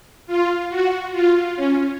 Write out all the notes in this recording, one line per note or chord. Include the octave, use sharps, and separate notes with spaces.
F4
F#4
F4
C#4